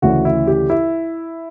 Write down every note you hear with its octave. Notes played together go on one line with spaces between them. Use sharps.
D2 C#3 E3 F#4
E4
G4
E4